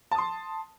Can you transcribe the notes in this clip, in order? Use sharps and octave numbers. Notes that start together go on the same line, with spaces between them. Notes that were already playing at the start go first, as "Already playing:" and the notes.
A5 C6 D#6